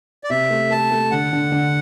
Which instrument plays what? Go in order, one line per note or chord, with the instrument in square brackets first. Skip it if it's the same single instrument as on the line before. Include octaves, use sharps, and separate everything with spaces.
[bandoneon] D5
[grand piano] C3 [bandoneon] E5
[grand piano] A3
[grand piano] A3 [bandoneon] A5
[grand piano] A3
[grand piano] D3 [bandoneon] F#5
[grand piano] D3
D3